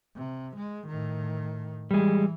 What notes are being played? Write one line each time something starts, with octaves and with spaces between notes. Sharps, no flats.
C3
G#3
A2 D#3
E3 G3 G#3